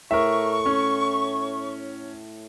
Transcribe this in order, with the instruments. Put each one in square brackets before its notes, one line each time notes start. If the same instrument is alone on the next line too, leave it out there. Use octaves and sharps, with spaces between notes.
[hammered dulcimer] A2 [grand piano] A#4 E5 [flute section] C#6
[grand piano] C#4